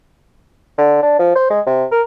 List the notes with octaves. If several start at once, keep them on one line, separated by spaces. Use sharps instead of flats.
D3
D4
F3
C5
G#3
C3
A#4